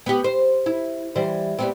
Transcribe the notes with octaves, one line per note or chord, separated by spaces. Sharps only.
B3 G4
C5
E4
E3 G3 C5
G3 B3 C4